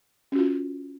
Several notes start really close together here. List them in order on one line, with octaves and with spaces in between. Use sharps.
C#4 F#4 F4